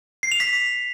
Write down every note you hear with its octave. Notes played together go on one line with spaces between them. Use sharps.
C7
F7
B6